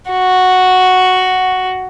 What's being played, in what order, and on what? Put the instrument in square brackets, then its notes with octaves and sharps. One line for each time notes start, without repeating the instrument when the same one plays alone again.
[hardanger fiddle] F#4